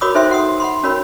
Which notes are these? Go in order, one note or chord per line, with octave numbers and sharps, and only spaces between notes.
F#4 A#4 C#5 B5 D6 D#6
D#4 A4 C5 E5 G5 C6
F#4 F#5 C6 D#6
F#5 B5 C6
C#4 F#4 A#4 C#5 B5